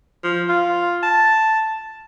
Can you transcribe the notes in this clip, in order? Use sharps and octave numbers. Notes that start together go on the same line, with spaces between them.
F3
F4
A5